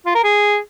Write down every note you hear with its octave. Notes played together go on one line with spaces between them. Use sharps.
F4
A#4
G#4